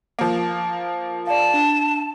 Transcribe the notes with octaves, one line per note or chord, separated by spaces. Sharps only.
F3 A#3
D5 F5 A5
D4